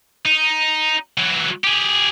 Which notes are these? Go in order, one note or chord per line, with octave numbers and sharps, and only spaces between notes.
D#4
E3 F#3
G4 G#4